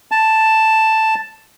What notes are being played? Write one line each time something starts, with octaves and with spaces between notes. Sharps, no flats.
A5